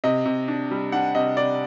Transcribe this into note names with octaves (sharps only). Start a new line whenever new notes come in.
C3 D#5
C3
D4
G3
D4 F#5
C3 D#5
C3 D5